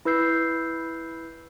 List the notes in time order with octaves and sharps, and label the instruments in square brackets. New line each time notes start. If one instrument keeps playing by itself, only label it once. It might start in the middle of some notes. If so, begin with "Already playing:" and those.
[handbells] E4 B4 E6 G6 C7